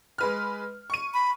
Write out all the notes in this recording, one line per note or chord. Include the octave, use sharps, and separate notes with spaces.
G#3 B4 F6
C#6 D#7
B5